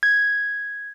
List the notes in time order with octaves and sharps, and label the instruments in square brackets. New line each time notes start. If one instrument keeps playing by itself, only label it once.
[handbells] G#6